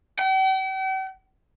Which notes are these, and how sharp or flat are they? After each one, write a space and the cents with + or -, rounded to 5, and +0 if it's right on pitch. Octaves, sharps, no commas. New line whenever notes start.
G5 -45